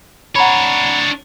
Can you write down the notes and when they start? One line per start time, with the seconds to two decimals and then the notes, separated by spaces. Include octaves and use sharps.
0.36 D4 C#5 F#5 A#5 B5